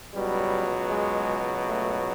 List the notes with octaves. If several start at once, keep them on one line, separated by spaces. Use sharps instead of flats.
C#2 B2 F#3 G3
G#3
A3